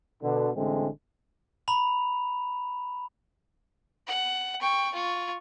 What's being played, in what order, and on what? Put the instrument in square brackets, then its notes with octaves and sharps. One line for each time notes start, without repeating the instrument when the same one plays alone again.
[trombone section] B2 D3
A1 D3 G#3 A3 C4
[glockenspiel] A#5 B5 F7
[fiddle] F#5
G5 C#6
F4 C#6